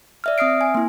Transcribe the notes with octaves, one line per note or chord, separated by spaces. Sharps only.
D5 E5 F6
C4 E5 D#6 F6 C7 D7
G#5
A#3 E4